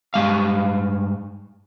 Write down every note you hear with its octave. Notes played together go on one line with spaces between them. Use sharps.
G2 G#3 F5